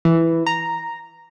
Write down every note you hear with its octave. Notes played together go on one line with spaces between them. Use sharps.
E3
A#5